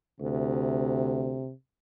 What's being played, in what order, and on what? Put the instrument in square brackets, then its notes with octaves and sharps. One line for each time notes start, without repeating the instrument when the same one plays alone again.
[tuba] D2 [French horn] C3